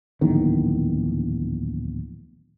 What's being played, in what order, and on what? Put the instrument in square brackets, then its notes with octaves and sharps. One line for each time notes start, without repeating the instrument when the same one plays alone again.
[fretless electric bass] D1 A#1 E2 D#3